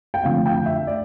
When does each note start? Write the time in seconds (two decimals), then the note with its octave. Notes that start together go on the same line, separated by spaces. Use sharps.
0.14 G5
0.24 F2 D3 A3 F5
0.46 G5
0.66 E5
0.87 D5